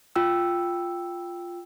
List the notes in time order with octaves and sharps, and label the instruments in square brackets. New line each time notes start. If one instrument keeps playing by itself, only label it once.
[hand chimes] F4 G5 E6